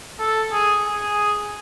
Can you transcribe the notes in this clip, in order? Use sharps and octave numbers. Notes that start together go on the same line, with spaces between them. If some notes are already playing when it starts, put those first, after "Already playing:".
A4
G#4
G#4